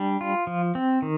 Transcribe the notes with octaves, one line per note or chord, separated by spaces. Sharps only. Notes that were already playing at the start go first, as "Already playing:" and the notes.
Already playing: G3 D4
F4
F3
C4
D#3